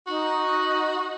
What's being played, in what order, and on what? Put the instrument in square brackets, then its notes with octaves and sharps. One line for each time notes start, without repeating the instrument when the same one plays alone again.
[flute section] D#4 [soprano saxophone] F#4